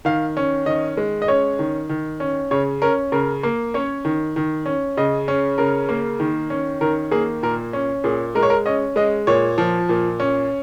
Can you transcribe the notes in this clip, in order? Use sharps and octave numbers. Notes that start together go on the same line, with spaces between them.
D#3 F5
C#4
D#3 D#5
G#3
D#5
C#4 C#5
D#3
D#3
C#4
C#3 C#5
C#4 A#4
C#3 A#4
A#3
C#4 C#5
D#3
D#3
C#4
C#3 D#5
C#4
C#3 A#4
A#3
D#3
C#4
D#3 A#4
A#3 G#4
A#2 A#4
C#4
A#2 G#4
G#3 A#4
C#5
A#4
C#4 D#5
G#3 D#5
A#2 C#5
F3
A#2
C#4